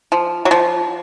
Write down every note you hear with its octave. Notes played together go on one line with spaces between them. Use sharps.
F3
F#3
F3